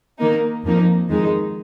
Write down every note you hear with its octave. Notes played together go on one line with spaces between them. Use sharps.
D#3 A#3 D#4
F2 F3 A#3 D#4
F2 D#3 G#3 D#4